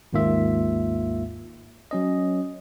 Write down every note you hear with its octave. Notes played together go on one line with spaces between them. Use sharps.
G#1 D#2 G#2 A#3 F4 E5
F#3 C#4 D#5